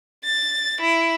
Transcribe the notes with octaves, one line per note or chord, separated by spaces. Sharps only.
A6
E4